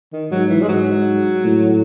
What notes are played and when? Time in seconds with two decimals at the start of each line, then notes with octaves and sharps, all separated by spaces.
0.13 D#3
0.31 G#2 F#3
0.50 E3
0.62 G#3
0.68 G#2 F#3
1.44 A2